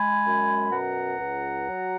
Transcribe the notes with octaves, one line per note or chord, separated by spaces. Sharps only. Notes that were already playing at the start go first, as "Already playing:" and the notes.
Already playing: G#3 G#5 B5
F#2
B2 F#5 A#5
C#2
F#3